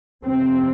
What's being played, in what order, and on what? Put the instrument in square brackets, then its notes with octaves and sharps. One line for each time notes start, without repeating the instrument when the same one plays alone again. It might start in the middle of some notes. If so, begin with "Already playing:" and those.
[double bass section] F2 C3 C4